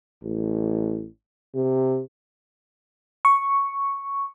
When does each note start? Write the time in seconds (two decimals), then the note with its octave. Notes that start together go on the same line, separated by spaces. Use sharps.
0.23 A1
1.54 C3
3.25 C#6